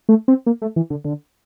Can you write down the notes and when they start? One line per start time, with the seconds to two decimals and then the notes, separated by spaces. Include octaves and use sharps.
0.09 A3
0.28 C4
0.47 A#3
0.62 A3
0.76 E3
0.90 D3
1.05 D3